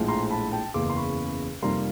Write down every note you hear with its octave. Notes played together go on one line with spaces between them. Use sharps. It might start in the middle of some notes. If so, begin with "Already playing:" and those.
Already playing: A#1 A2 F3 G#3
A#5 C6
A5 B5
G5 A5
F#1 E2 C#3 C6 D6
C6
B5 C#6
F2 C3 D#3 G3 A#3 A#5 C6